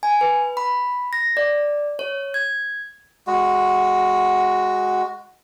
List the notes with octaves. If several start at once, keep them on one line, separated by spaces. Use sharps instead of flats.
G#5
B4
B5
A#6
D5
C#5
G#6
G#3 F#4